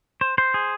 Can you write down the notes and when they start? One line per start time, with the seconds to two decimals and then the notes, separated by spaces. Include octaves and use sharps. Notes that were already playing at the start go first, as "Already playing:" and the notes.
0.21 C5
0.38 C5
0.54 G#4